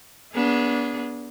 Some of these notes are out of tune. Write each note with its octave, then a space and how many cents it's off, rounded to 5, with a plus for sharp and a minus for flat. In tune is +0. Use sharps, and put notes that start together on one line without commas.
B3 -30 D4 -30 G#4 +0